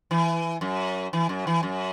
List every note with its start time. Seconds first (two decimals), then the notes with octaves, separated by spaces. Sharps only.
0.11 E3
0.61 F#2
1.13 E3
1.29 F#2
1.47 E3
1.63 F#2